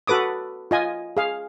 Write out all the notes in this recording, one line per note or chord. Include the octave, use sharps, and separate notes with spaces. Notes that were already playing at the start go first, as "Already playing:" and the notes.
F#4 A4 B4 D6 D#6
F4 D#5 G#5
G#4 F5